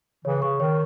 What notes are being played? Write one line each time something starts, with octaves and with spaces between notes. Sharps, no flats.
C#3 E3 C#5
C#3 C#6
D#3 C#5